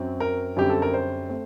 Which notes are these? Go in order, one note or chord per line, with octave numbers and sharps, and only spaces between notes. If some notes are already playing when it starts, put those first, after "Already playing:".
Already playing: F#2 F#3 C4
A#4
F#2 D3 G3 C4 G4
A4
A#4
C5
A3 C4